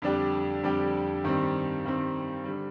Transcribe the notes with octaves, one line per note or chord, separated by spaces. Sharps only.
F2 D3 G3 D4 G4
F2 D3 G3 D4 G4
G2 D#3 G3 C4
G2 D#3 G3 C4
D3 G3